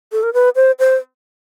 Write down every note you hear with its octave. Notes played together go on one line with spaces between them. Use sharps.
A4
A#4
B4
C5
C5